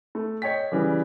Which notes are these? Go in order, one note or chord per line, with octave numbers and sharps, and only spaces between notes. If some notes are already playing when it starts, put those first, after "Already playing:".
A3
C#5 D#5 G5 B6
C#3 E3 G3